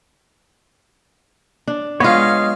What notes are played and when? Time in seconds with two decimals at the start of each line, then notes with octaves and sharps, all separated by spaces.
1.68 D4
2.00 G#3 B3 F4 C#5 D#5 F5